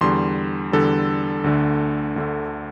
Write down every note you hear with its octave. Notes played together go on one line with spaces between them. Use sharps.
E2 D3 G3 C6
E2 D3 G3 A4
D2 D3 A3
D2 D3 A3